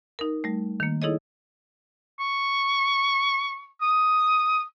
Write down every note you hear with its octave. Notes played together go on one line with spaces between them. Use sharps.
D#4 A#4
G3 A3
D#3 A#3
D#4 E4 G#4 A4 C#5 D#5
C#6
D#6